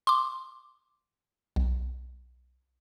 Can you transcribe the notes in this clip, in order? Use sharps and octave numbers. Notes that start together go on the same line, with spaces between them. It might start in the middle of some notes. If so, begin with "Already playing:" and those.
C6 D6
B1